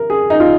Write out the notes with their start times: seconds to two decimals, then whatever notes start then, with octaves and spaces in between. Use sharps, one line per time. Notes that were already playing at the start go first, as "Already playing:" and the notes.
Already playing: A#4
0.10 G#4
0.30 D#4
0.40 F4